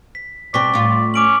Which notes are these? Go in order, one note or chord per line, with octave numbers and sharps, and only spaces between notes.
B6
B2 C4 D5 C6 C#6 B6
A2 F4
C#4 D6 D7 F#7